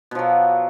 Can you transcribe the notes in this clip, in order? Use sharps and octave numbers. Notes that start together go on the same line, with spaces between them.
B2 F3 F#3